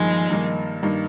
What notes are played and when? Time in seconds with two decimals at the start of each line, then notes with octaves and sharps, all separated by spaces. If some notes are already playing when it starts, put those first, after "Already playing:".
Already playing: G2 D#3 F3 G#3 A#3 D#4
0.30 G2 D#3 A#3 D#4
0.83 G2 D#3 A#3 D#4